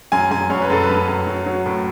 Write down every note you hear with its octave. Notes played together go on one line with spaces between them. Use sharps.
F#2 G#5
F#2 G#5
F#2 C#5
B4
F#2 A4
B4
F#2
F#2
F#3
F#3
A2